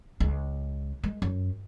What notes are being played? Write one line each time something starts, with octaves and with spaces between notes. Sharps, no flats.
C#2 G#3
G#3
F#2